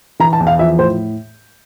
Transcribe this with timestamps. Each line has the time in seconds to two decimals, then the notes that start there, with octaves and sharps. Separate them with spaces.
0.20 E3 A#5
0.33 A5
0.40 E2
0.47 F5
0.59 F3 E5
0.79 A2 C5